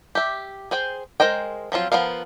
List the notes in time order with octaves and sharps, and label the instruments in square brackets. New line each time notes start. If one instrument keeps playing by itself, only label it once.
[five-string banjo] G4 E5
G#4 C5 G5
G#3 A#4 C5 D#5 G5
F3 F#3 C4 F4
F3 B3 D#4 A#4 F5